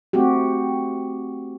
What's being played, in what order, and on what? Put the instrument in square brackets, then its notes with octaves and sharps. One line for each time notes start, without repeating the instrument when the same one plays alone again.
[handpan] A3 C4 F#4 G4